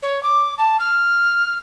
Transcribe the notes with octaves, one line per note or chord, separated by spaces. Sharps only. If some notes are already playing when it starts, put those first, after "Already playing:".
C#5
D6
A5
F6